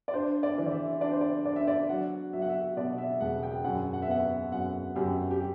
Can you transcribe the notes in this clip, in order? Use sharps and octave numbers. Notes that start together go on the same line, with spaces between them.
D5
D4 C5
D5
E3
D5
E5
D4 D5
C5
D5
D4 D5
E5
D5
F#3 F#5
F#3 E5
F#5
E5
B2 D5
E5
E1 F#5
G5
F#2 F#5
F#5
E5
B3 F#5
F#2 F#5
F#2 G4
G4